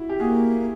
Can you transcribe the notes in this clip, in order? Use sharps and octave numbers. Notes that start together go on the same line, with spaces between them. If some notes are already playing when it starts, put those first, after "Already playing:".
Already playing: E4 F#4
G4
A#3 F#4 G#4